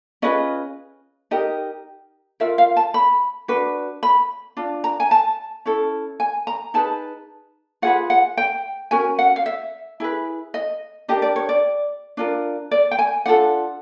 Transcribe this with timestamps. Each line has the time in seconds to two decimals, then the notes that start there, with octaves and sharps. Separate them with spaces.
0.22 C#4 F4 G#4 B4 D#5
1.31 D#4 G4 A#4 D#5
2.40 F4 A#4 E5
2.58 F5
2.77 A5
2.94 B5
3.48 D4 F#4 B4
4.03 B5
4.57 D4 F4
4.84 A#5
5.00 G#5
5.11 A5
5.66 C#4 E4 A4
6.20 G#5
6.47 A#5
6.74 D#4 G#4 B4 A5
7.82 F4 G#4 B4 F#5
8.10 F#5
8.37 G5
8.91 C#4 F#4 A#4 G#5
9.19 F#5
9.36 F5
9.46 E5
10.00 E4 G#4 B4
10.54 D#5
11.08 D4 G4 A#4 D#5
11.22 D5
11.36 C#5
11.49 D5
12.17 D4 F4 A#4
12.71 D5
12.91 G5
12.99 G#5
13.26 D4 F4 A4 F#5